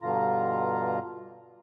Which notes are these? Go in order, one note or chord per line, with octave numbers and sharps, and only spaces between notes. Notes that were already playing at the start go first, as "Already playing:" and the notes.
G2 B2 D3 F4 A#5